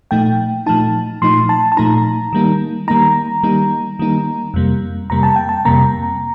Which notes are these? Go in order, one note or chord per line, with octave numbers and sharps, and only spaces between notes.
A#2 F3 A3 D#4 G5
A#2 F3 A3 D#4 A5
A#2 F3 A3 D#4 C6
A5
A5
A#2 F3 A3 D#4 A#5
D#3 G3 A#3 D#4
D#3 G3 A#3 D#4 A#5
D#3 G3 A#3 D#4
D#3 G3 A#3 D#4
F2 C3 G3 A#3
F2 C3 G3 A#3 A#5
A5
G5
A5
F2 C3 G3 A#3 A#5